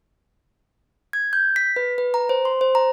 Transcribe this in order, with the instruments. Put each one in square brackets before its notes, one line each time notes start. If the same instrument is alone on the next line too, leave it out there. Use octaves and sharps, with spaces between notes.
[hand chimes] G#6
G6
B6
B4
B4
A#5
C5
C6
C5
A#5